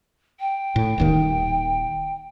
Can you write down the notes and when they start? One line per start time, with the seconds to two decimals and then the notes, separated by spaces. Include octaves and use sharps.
0.40 G5
0.76 A2
0.98 D#1 D#2 D#3